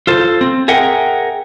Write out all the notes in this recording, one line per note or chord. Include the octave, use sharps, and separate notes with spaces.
F4 A4 C5
C4
G#4 A#4 E5 F#5 G5